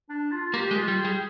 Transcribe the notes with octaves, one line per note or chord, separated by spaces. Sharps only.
D4
F4
F4
A#3 G4
G#3
F4
G3
G#4
G3